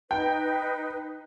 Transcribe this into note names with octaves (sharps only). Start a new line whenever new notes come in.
D#4 B4 G5